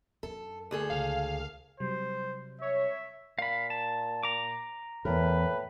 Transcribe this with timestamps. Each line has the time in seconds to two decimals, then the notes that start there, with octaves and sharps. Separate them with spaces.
0.23 F#2 A4
0.71 D2 G#4 A4
0.90 C#2 F5
1.80 C3 F#3 G3 C5
2.61 C#5 E5
3.39 A#2 F5 B5
3.70 A5
4.23 A#5 D6
5.05 E2 A2 A#4 B4